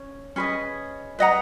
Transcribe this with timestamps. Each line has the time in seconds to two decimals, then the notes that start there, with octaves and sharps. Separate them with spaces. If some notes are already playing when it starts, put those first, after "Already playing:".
Already playing: C#4
0.36 C#4 G#4 B4 D#5
1.19 B4 D#5 F#5 A#5